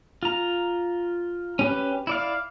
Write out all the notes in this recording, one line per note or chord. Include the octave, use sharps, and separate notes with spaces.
F4 A#5
C#4 G4 B4
E4 D5 F5